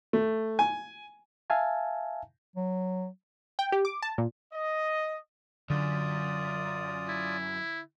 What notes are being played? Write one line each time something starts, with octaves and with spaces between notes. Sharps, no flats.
A3
G#5
E5 F5 G#5 A5
F#3
G5
G4
D6
A5
A#2
D#5
F#2 D3 F4 D5 D#6
E4